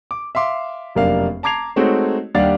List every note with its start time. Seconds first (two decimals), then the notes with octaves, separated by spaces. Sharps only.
0.11 D6
0.35 E5 F5 C6 D6
0.95 F1 F#2 A#3 D4 F5
1.43 A5 A#5 D6 G#6 C7 F7
1.76 G#3 A3 C4 D#4 F#4 C#5
2.35 D#2 G3 D4 F5 F#5 A6